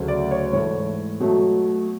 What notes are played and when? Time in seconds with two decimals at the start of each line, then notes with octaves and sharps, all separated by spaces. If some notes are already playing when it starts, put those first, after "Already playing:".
Already playing: D2 C#3 F#3 A3
0.08 D5
0.31 C#5
0.53 G#2 E3 A3 C#5
1.20 B2 F#3 A3